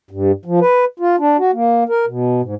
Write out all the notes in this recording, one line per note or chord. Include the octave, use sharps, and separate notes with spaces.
G2
F3
B4
F4
D4
F#4
A#3
A#4
B2
G#2